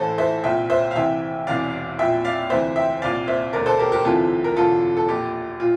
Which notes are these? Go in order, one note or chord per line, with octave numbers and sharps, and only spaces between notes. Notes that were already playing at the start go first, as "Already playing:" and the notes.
Already playing: A1 A2 E3 A4 C5
C5 E5
C2 A#2 E5 G5
C5 E5
F5
C2 C3 E3 E5 G5
E1 E2 C3 E3 D5 F5
A#1 A#2 E5 G5
D5 F5
D2 C3 E3 C5 E5
E5 G5
C2 A#2 D5 F5
C5 E5
E1 D2 D3 A#4 D5
A4 C5
G4 A#4
G4 A#4
D2 C3 E3 F4 A4
A#4
E1 E2 D3 F4 A4
A4
A#1 A#2 G4
A#2 F4